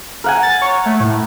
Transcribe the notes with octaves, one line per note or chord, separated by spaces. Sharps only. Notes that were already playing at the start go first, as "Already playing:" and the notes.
A#4 F#5 G#5
A6
C#5
A3
A2